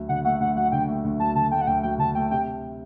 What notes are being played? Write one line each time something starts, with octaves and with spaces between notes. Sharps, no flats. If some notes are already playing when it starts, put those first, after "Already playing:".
Already playing: D2 F#3
D3 F#5
A3 F#5
D2 F#5
F#3 F#5
D3 G5
A3
D2
F#3 A5
D3 A5
A3 G5
F#5
D2 G5
F#3 G5
D3 A5
A3 G5
C3 G5